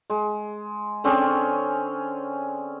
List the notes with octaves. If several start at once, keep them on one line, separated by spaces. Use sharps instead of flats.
G#3
D3 C4 C#4 G#4